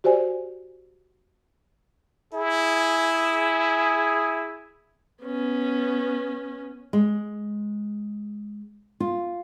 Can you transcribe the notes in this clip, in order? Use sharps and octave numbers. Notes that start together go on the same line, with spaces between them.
F#4 G4 C5 D5 G#5
E4 G#4
B3 C#4
G#3
F4